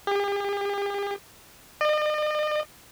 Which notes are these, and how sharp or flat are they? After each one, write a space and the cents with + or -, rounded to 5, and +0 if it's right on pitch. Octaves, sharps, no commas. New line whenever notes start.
G4 +45
D#5 -45